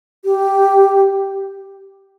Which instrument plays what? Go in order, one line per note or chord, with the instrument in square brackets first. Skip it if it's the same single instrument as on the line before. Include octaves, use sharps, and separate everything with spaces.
[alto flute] G4